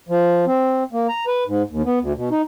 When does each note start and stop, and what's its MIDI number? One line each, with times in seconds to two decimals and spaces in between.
0.09 0.45 53
0.47 0.83 60
0.93 1.07 58
1.09 1.25 82
1.27 1.44 71
1.47 1.62 44
1.70 1.82 39
1.85 1.99 59
2.01 2.13 38
2.15 2.29 47
2.31 2.42 63